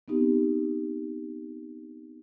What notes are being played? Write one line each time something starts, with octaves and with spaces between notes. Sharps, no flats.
B3 C4 D#4 G4